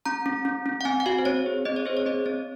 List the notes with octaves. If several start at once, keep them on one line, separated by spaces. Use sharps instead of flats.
C#4 A#5
C#4
C#4
C#4
F#5
C4 G#5
F#5
F#4 F5
C5
C4 C#5
G#4
C4 D#5
C#5
G#4 C5
C#5
C4 D#5
C4 C#5